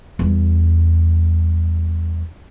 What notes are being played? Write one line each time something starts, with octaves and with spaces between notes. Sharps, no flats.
E2 G3